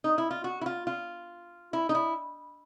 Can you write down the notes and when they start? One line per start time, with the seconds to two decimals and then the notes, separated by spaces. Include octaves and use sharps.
0.04 D#4
0.18 E4
0.31 F4
0.44 F#4
0.61 E4
0.66 F4
0.87 F4
1.73 E4
1.89 D#4
1.95 E4